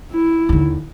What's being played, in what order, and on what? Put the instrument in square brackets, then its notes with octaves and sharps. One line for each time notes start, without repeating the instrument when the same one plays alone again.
[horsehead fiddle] E4
[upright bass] D#2 D3